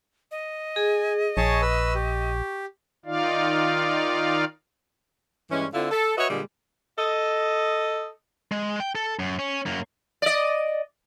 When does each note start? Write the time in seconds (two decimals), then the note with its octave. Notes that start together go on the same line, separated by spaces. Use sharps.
0.31 D#5
0.76 G#4 G#5
1.37 A#1 G#4 C#5 A5 C#6
1.62 B4 E6
1.95 G4
3.05 D#3 D#4 F4 D5 F5
5.51 G2 E3 G#3 C#4
5.74 D3 C4 E4 F4
5.91 A4
6.17 F#4 B4 C#5 D#5 E5
6.30 A#2 D3 G3 G#3
6.99 A4 D#5
8.52 G#3
8.80 G5
8.95 A4
9.19 F#2
9.39 C#4
9.66 F#2 A#3
10.22 D5 D#5